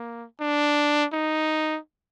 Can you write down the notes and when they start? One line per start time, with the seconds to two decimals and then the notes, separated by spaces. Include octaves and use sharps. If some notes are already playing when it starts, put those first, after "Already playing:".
Already playing: A#3
0.40 D4
1.13 D#4